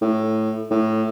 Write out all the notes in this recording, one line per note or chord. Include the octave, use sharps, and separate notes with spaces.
A2
A2